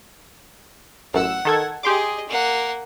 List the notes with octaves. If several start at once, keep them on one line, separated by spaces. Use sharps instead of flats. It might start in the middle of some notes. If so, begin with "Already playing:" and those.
A1 F#2 F#5 E6
D#3 A4 G#6
G4 G#4 D#5 C6 D6
A#3 F#5